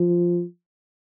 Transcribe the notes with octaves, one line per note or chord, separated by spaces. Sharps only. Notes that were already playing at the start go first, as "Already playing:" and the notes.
Already playing: F3